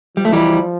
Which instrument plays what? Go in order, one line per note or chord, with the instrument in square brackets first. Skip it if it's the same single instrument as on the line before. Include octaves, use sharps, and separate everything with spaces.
[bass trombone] F3 [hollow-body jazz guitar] G3
[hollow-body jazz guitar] A3
E3 G3